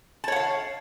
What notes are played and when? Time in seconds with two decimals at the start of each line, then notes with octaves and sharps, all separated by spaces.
0.24 A5
0.28 C#5
0.32 F#5
0.36 F5